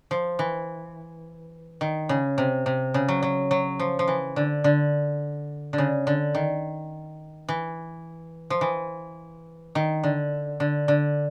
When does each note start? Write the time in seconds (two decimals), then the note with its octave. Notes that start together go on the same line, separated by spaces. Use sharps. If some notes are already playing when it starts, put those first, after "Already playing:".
0.11 F3
0.39 E3
1.81 D#3
2.09 C#3
2.38 C3
2.66 C3
2.94 C#3
3.08 F#3
3.23 F#3
3.51 F#3
3.80 F3
3.99 F3
4.08 E3
4.36 D3
4.64 D3
5.73 D3
5.78 C#3
6.07 D3
6.35 D#3
7.49 E3
8.50 F3
8.61 E3
9.75 D#3
10.03 D3
10.60 D3
10.88 D3